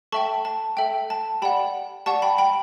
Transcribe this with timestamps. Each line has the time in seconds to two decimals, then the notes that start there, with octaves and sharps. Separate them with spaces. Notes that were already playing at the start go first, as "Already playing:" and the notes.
0.12 A4 E5 G5 A5 C#6
0.45 A5
0.77 A4 E5 G5
1.10 A5
1.42 G4 D5 F#5 G5 B5
2.06 G4 D5 F#5 A5 C#6
2.22 G5 B5
2.38 G5 B5